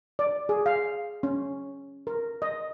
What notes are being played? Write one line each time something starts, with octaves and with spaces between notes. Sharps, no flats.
D5
G#4
F5
C#4
A#4
D#5